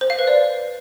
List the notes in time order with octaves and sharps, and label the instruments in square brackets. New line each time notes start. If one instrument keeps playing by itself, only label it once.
[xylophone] C5
F5
B4
D5